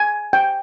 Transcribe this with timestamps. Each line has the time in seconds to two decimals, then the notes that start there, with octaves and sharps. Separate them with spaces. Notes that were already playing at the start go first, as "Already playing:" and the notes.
Already playing: G#5
0.33 G5